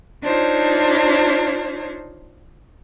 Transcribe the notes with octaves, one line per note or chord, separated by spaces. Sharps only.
D4 D#4 F4 C5 C#5